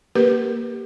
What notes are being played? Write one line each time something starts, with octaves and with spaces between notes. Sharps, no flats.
A#3 G4 A#4 B4